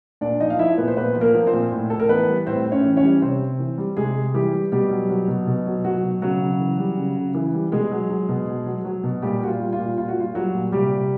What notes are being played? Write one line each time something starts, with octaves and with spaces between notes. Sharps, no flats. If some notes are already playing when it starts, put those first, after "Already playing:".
A#2 D4 D5
F3 D#4 D#5
F5
F3 E4 E5
A#2 B3 B4
C5
A#2 B3 B4
F3
A#3 A#4
F3
C4 C5
A#2
A2
A2 A4
A#4
E3 B3 B4
G3
A2 C4 C5
A2
C#4 C#5
E3
C#4 C#5
G3
C3 C4 C5
C3
E3
G3
C3 G#3 G#4
C3
E3 G3 G4
G3
B2 G3 G4
F#3
F#3
B2
B2
F#3
F#3 F#4
B2
C#3 F#3 F#4
C#3
E3
G3
C#3
C#3
E3
G3
B2 G#3 G#4
F#3
F#3
B2
B2
F#3
F#3
B2
A#2 G3 G4
G3 F#4
F4
G3
F4
A#2
A#2 F4
F#4
G3 F4
F#3 G3 F#4
A#2
C3 G3 G4
C3